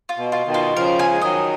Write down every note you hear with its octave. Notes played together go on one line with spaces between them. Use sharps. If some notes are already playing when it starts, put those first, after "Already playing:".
F4
B2
F4
B2 D#3
F4
C#3 F3 A#4
G#5
G#3
D#3 F#3 D#5